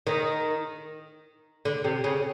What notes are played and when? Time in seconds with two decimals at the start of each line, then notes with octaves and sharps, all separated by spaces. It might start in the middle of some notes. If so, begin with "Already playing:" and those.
0.07 D#3
1.65 D3
1.84 C3
2.04 C#3